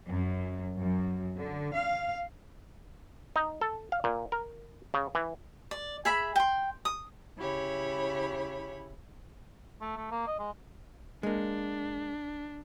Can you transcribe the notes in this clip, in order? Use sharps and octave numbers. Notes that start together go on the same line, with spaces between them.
F#2
F#2
D3
F5
D#4
A4
F5
A#2
A#4
C#3
E3
D5
G#4 E5 B5
G5 C6
D#6
C#3 E4 G4 C#5 B5
A3
A3
A#3
D#5
G#3
G#3 A#3 D4